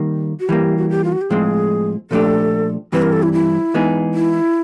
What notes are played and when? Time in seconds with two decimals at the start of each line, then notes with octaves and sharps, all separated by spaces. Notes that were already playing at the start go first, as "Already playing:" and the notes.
Already playing: D#3 G3 A#3
0.40 F#4
0.49 E3 G3 A#3 G4
0.77 F#4
0.90 G4
1.04 F4
1.12 F#4
1.21 G4
1.30 A2 F3 G#3 C4 G#4
2.11 A#2 F3 A3 D4 G4 A4
2.92 G2 E3 G3 C4 B4
3.02 A#4
3.13 A4
3.23 E4
3.33 E4
3.74 E3 G#3 B3 D#4 G#4
4.14 E4